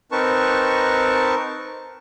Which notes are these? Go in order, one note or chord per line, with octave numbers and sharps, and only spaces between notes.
C4 D#4 A#4 B4 A5 C#6